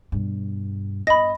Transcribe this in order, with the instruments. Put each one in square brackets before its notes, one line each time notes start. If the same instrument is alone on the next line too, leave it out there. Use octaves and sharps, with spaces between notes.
[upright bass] G2 B2
[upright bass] G2 B3 [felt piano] D#5 [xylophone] B5 A#6